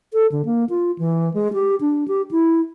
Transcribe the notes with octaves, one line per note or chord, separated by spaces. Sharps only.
A4
D3
A#3
F4
E3
G#3
G4
D4
G4
E4